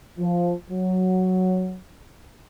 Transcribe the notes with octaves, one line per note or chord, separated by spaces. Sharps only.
F3
F#3